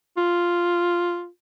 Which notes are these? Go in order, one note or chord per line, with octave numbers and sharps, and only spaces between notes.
F4